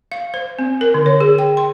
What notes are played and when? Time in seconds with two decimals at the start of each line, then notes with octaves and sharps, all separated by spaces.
0.12 F5
0.34 C5
0.59 C4
0.81 A#4
0.94 D3
1.06 C#5
1.21 G#4
1.38 G5
1.57 C6